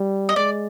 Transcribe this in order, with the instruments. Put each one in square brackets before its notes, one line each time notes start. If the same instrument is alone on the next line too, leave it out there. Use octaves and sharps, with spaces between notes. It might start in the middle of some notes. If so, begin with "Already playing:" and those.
Already playing: [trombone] G3
[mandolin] D#5
[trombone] G#3 [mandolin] D5